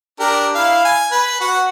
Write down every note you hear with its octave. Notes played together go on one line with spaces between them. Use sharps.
D4 G4 A#4
E4 F5
G#5
B4
F#4 F#5